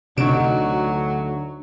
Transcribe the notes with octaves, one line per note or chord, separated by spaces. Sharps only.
D2 C3 F#3 D4 D#4 D7 E7